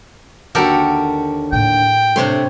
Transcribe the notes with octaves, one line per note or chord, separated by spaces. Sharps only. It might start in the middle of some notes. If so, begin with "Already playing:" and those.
D#2 D3 F#4 G4 A4 A#4
A2 A#3 G5
C3 A3 D4 C#5 C6